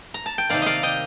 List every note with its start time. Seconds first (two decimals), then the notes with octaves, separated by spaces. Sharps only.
0.14 A#5
0.26 A5
0.38 G5
0.49 C3 D#3 A#3 D5 F5
0.62 D5 D#5 F5
0.83 D#5 G5